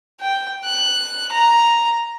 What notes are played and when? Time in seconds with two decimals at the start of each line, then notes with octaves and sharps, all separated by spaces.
0.20 G5
0.64 F#6
1.32 A#5